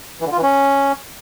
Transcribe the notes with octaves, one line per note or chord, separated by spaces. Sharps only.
E3
D3
F4
E3
C#4